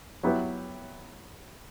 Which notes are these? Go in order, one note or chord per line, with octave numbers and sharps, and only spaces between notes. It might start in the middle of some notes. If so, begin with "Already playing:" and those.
F#3 B3 E4 G4 B4